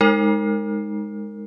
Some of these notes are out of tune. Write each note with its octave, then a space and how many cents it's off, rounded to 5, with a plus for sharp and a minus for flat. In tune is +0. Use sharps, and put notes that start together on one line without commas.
G#3 +0 D#4 +0 A#4 -20